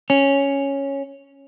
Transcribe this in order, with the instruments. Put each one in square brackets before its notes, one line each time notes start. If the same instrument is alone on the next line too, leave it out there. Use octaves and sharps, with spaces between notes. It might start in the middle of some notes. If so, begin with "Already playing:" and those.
[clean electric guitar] C#4